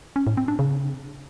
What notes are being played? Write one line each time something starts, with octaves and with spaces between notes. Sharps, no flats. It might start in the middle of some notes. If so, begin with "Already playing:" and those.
C#4
A2
C4
D4
C#3